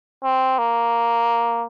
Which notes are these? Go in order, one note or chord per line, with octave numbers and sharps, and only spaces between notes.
C4
A#3